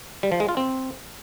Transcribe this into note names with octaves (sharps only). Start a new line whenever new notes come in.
G3
F3
G#3
F4
C4